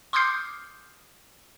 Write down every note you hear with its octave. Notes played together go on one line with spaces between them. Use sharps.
C6 D6 D#6 F6 G6 C7